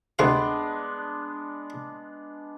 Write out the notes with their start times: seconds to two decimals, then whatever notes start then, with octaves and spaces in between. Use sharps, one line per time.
0.19 D2 C3 G#3 B3 D4 F5